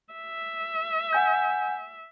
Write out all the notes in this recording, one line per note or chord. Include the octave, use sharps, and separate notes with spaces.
E5
F#5 G#5 G6